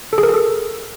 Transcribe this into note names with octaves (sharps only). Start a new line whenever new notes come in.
A4
G#4
A#4
G#4
A4